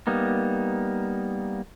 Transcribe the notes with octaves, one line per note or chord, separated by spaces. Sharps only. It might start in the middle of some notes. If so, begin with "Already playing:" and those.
G3 A#3 B3 D#4